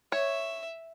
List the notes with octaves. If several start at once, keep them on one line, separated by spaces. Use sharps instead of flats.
C#5 E5